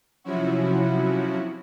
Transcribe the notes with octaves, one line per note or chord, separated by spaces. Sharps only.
C3 F3 F#3 C#4 E4 F#4